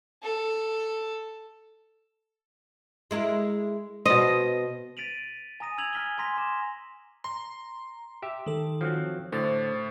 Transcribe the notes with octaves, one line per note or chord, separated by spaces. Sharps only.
A4
G#3 E4 A#4
B2 C5 D#5
A6 B6 D7 D#7 F7 F#7
G#5 A#5 D#6 A#6 D#7
E6 G#6 F7 F#7
G#5 F6 B6 F#7 G7
G#5 A#5 C6 A#6 B6 F7
C6 D6 E7
A#5 C6
G4 E5
D#3 A4
F3 F#3 C4
A2 D3 C5 A6